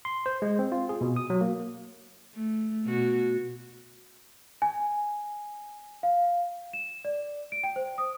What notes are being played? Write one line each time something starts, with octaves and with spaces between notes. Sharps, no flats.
C6
C5
G#3
C4
F4
G#4
B2
D#6
F#3
A#3
A3
B2 F#4
G#5
F5
E7
D5
D7
G5
C5
D#6